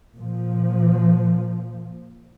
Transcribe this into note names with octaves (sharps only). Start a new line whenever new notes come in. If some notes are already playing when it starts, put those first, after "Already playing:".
A#2 F3